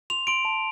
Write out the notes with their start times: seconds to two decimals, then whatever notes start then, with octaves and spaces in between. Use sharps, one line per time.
0.10 C6 F7
0.27 C6 D7
0.45 A5